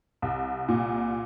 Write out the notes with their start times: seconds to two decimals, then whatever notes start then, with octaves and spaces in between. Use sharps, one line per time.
0.22 C2
0.69 A#2